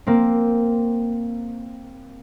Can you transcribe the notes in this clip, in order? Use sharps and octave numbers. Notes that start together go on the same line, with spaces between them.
A#3 C4